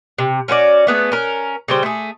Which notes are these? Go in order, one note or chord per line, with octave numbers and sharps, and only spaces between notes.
C3
C#4 F#4 B4 D5
A3 B3 G#4
C#4 A#4
C#3 G3 C5
A3 G#4